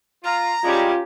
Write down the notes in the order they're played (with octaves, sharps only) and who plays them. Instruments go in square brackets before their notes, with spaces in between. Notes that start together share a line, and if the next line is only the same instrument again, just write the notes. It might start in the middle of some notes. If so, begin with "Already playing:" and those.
[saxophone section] F4 [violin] A#5
[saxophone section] G3 G#3 D5 [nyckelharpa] C#4 G4 [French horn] F4